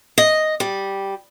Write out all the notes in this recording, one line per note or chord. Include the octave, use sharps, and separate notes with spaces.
D#5
G3